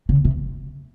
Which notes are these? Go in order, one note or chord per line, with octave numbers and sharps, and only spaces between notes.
C#3
C3